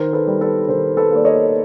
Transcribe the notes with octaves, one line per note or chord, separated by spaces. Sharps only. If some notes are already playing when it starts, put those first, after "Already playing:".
Already playing: D#3 A#4 C5
A4 B4
G3
A4 B4
D#3 A#4 C5
A4 B4
A#3 D5
C#5 D#5